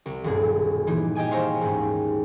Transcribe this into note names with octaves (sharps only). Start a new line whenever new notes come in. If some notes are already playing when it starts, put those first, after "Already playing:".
C2
D#1 B1 G2 G#4
A#2 E3 A#3 D#4
G4 D#5 G5 G#5 D#6
C5 C#5 E5 F5 G5 A#5
D#2 G#2 C#4